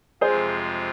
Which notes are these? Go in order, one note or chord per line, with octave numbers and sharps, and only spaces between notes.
F2 C3 G#3 F4 G#4 C5